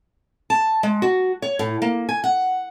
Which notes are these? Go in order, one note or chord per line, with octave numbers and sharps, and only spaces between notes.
A5
G#3
F#4
C#5
A2
A#3
G#5
F#5